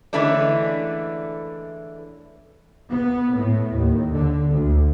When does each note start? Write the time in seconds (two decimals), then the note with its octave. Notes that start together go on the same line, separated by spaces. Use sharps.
0.13 D3 E3 G#3 A3 C#4 D4
2.90 B3
3.35 A2
3.74 D#2
4.12 D3
4.48 D2